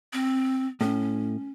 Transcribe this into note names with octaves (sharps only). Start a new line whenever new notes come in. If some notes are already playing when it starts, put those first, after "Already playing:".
C4
A2 C#4